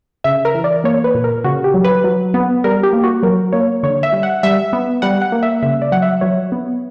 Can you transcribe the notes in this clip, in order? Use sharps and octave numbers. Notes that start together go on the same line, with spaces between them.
C#3 E5
A#4
E3
D5
A#3 C#5
B4
A#2
A#4
C#3 F#4
G4
F#3
B4
F#3
B3
G3 A#4
G4
A#3
F#4
F#3 A#4
A#3 C#5
D3 C#5
E5
G3
F#5
G3 E5
B3
G3 F#5
F#5
A#3
E5
C#3 E5
D5
F#3 F#5
E5
F#3 C#5
B3